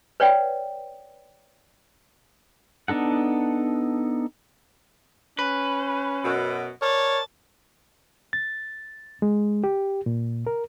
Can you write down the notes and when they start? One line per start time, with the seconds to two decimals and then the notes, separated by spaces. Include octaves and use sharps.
0.20 B4 C#5 D5 F#5 G5
2.88 B3 D4 D#4 A4 F#5
5.39 C#4 B4
6.23 F#2 B2
6.82 A#4 C#5 D5 A5
8.33 A6
9.22 G#3
9.64 G4
10.06 A#2
10.47 A#4